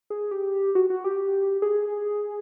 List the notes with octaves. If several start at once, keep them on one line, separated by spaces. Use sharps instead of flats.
G#4
G4
F#4
F#4
G4
G#4